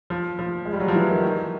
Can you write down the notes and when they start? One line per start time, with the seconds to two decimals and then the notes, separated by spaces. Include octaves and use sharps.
0.10 F3
0.39 F3
0.66 G#3
0.73 G3
0.80 F#3
0.88 F3
0.95 E3
1.09 D#3
1.23 D#3